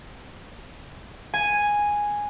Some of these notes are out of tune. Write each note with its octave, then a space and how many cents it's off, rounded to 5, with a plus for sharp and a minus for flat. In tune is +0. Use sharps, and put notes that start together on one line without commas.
G#5 -5